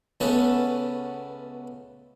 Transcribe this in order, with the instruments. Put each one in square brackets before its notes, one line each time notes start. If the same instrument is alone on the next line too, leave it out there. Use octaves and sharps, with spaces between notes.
[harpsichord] C#2 A3 B3 C#4 A5